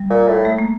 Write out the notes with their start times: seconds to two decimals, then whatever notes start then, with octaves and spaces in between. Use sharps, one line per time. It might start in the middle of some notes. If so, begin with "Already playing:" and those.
Already playing: G3
0.10 A#2
0.28 A2
0.45 A3
0.58 A#3